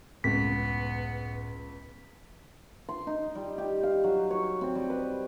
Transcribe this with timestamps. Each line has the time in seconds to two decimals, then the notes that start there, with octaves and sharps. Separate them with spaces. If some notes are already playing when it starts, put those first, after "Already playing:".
0.24 C#2 F#2 A2 B3 B6
2.89 C6
3.07 D#4
3.35 G3
3.58 G4
3.83 F5
4.04 F#3
4.31 C#5
4.61 C4
4.75 G3
4.90 B4